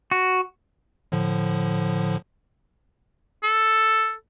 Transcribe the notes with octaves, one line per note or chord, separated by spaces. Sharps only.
F#4
A2 D3 F3
A4